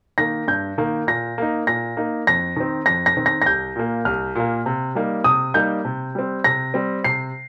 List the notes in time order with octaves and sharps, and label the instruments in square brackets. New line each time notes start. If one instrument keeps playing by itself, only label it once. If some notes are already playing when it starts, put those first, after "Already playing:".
[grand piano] D#3 A#3 [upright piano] A#6
[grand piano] G2 [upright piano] G6
[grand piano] D#3 A#3
[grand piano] A#2 [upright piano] A#6
[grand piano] A#3 D#4
[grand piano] A#2 [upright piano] A#6
[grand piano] A#3 D#4
[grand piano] F2 [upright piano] A#6
[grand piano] D#3 C4
[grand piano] F2 [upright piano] A#6
[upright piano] A#6
[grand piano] D#3 C4
[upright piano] A#6
A#6
[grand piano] C2 [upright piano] G6
[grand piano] A#2 A#3
[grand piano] C2 [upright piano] F6
[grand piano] A#2 A#3
C3
G3 A#3 D#4
[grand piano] C3 [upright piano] D#6
[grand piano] G3 A#3 D#4 [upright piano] G6
[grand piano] C3
G3 C4
[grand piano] C3 [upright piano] A#6
[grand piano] G3 C4
[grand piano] C3 [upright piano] C7